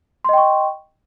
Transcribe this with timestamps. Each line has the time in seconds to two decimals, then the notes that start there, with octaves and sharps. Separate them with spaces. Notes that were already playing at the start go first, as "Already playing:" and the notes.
0.25 C6
0.29 D#5
0.33 G5
0.38 C#6